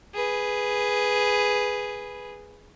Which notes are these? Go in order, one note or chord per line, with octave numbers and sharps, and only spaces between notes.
G#4 B4